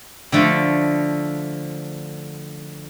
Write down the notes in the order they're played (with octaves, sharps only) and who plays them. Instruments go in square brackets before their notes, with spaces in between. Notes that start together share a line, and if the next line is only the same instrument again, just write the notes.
[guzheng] D3 F3 A3